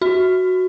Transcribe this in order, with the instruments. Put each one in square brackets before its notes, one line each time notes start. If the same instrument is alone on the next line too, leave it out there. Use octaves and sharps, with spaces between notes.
[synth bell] F#4